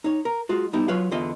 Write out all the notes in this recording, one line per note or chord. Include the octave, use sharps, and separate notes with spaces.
D#4 C#5
A#4
G#3 F4 F#4
G3 B3 D#4 E4 G4
F#3 F4 B4 C#5 F5
E2 D3 F4 D#5 E5